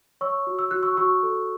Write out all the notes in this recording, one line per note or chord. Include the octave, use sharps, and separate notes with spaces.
C#5 C#6 E6
F#4
E6
F#4 F#6
C#6 E6
F#4 C#6 E6
A4